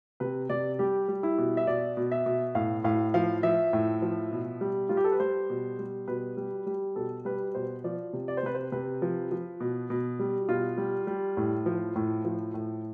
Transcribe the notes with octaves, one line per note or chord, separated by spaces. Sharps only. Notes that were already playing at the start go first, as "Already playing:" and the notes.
C3 B4
C3 D5
G3 G4
G3
E4
B2
E5
B2 D5
B2
E5
B2
A2 F5
A2 F5
F3 F5
F3 E5
A2
F3
B2
G3
G3 F4
G4
A4
B4
G3 C5
B2
G3
B2 B4
G3
G3
B2 A4
G3 B4
B2 C5
F3 D5
C3
D5
C5
C3 B4
C5
C3 B4
F3
F3
B2
B2
G3
B2 F4
G3
G3
A2
F3
A2
F3
A2